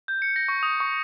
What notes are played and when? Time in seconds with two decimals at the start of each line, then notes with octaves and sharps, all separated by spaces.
0.08 G6
0.22 C#7
0.36 A#6
0.48 C#6
0.63 D#6
0.80 C#6